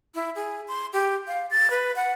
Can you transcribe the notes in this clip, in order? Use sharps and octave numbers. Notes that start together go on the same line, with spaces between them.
E4
G#4
C6
G4
F5
A6
B4
F#5